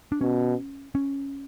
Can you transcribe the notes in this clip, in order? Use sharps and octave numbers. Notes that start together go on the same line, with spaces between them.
D4
B2 C#4
C#4